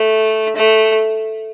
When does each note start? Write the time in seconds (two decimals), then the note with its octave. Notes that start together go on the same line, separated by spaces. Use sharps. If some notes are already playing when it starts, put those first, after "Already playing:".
Already playing: A3
0.56 A3